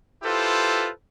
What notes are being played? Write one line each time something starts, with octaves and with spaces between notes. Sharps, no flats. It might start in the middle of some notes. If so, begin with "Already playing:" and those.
E4 F4 G4 A4 B4 C5